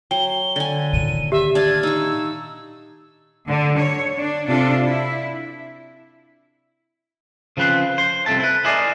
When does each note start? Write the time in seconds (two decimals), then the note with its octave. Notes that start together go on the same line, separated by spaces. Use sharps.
0.11 F#3 G5 G7
0.56 D3 G#5
0.93 A#2 D#3 D#7
1.32 G4 E5
1.55 D4 F5 A5 G#6
1.83 D#4 C#6 E6
3.48 D3
3.78 C#5
4.16 D4
4.48 C3 D4 F4 A4
4.85 E4
7.57 C#3 F3 C4 B4 C5
7.98 C5
8.26 C2 F2 C4 A4 E5 A5
8.40 E4 B4
8.65 E4 G#4 A#4 C5 D5 D#5